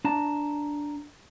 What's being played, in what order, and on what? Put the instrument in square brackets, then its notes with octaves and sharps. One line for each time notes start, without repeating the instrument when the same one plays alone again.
[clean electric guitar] D4 A5 A#5